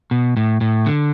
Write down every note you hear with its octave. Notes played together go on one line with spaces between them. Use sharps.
B2
A2
A2
D3